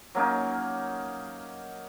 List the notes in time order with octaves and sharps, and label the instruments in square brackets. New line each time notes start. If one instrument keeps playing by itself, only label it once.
[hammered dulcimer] F#3 A#3 C#4 D#4